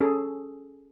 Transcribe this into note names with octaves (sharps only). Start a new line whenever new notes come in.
C#4 G#4 A4